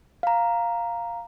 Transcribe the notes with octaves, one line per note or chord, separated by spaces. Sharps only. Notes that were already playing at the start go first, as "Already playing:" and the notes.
F5 A#5